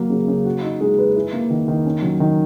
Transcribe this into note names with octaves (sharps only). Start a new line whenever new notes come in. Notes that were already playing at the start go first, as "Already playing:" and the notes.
Already playing: F#3 A#3
C#3
C#3
F#4
D#4
G#3
B4
E4
A#3
D#3
D#3
C#4
F#3
D#3